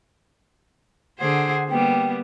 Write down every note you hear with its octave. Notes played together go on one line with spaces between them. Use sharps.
D3 G#4 C5 F#5
G3 A#3 B3 G5